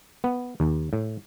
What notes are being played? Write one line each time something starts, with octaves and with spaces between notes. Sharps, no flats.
B3
D#2
A2